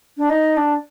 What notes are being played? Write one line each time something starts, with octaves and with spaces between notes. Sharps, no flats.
D4
D#4
D4